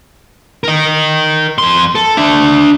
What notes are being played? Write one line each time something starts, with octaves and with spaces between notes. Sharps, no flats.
A#4 D#5
F2 C6
A4
D4 E5